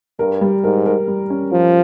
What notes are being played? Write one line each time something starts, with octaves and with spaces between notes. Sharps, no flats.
G2 A#4
G3
G#2 A#4
A#4
G3
C#4
F3 F4